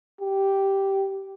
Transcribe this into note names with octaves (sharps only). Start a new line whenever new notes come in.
G4